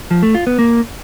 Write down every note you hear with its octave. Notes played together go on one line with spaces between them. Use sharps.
F3
A3
F4
B3
A#3